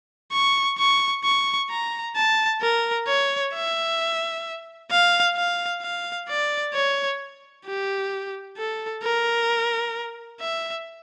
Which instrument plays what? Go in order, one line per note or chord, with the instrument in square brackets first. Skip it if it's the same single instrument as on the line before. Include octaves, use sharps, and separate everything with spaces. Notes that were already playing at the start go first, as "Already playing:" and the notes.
[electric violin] C#6
C#6
C#6
A#5
A5
A#4
C#5
E5
F5
F5
F5
D5
C#5
G4
A4
A#4
E5